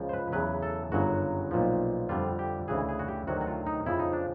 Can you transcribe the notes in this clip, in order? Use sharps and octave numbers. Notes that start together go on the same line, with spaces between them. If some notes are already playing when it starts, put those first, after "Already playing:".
Already playing: C#2 C#3 F3
C5
B4
E2 C#3 F#3 B4
A4
G1 F#2 C#3 F#3 F#4
B1 A#2 F3
F2 D3 G3 F4
G4
D2 C#3 E3 G#4
G#4
F#4
G4
D2 C3 D#3 F#3 F#4
F#4
F4
D#4
F2 C#3 F3 E4
D#4
D4